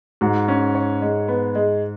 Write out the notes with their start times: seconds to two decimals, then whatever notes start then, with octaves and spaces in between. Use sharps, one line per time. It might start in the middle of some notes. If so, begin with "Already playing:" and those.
0.21 G#2 F#4
0.48 C#4
0.75 C#5
1.02 G#3
1.28 B3
1.55 G#3